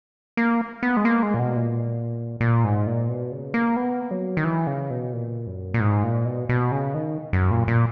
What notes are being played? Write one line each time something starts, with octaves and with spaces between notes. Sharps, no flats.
A#3
B3
G#3
A#3
G#3
A#2
B2
A#2
A#2
G#2
A#2
B2
C#3
A#3
B3
F#3
D#3
E3
C#3
B2
A#2
F#2
A#2
G#2
A#2
B2
B2
C#3
D#3
F#2
A#2
A#2